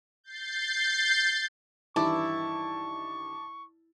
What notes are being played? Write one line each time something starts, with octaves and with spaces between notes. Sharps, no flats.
G6 A6 C7
G2 D#3 E3 E4 A5 C#6 D6